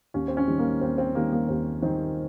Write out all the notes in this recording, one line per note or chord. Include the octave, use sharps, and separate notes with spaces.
D#2 C#4
C4
C#4
D#3 G3
A#3
D#2 C4
C4
D#3 G3 A#3
A#3
D#2 C4
D#3 G3 C4